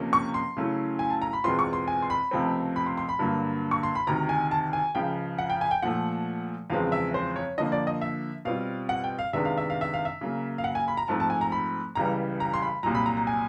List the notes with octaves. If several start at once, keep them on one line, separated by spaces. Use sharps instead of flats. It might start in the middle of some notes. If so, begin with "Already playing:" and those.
Already playing: C#2 C3 F3 A#3 C#4
C#6
C6
C#3 F#3 A3 C#4 E4
G#5
A5
A#5
B5
E2 B2 G#3 C4 F4 C6
C#6
C6
G#5
C6
B5
C#2 C3 F3 A3 C4
B5
C6
C6
B5
G2 D3 F#3 A#3
C#6
C6
B5
D2 C3 D#3 A#5
G#5
A5
G#5
C#2 C#3 F3 G5
F#5
G5
G#5
G5
A#2 F3 A3 F#5
E2 C#3 F3 G#3 C4 F5
E5
C5
C#5
D3 F3 A#3 D#5
D5
D#5
E5
B2 G3 C4 F4 F5
F#5
G5
F5
C3 D#3 G#3 B3 D4 E5
F5
E5
F5
E5
F5
E5
C#3 F#3 A#3
F5
F#5
G#5
B5
A#5
G#2 F3 A3 C4 A5
A5
G#5
A#5
B5
C#2 C#3 E3 G3 A#5
A#5
C6
B5
C2 A#2 F#3 A#5
B5
A#5
A#5
G#5